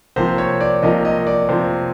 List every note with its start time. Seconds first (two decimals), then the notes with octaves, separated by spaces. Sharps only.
0.16 C3 F3 A#3 C5
0.38 C#5
0.61 D5
0.83 C3 F3 A#3 D#5
1.05 D#5
1.27 D5
1.49 C3 F3 A#3 C5